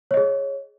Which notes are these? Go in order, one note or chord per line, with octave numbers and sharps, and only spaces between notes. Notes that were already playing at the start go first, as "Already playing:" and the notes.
G#4 C#5 D#5